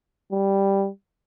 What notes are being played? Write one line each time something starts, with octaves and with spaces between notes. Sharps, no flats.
G3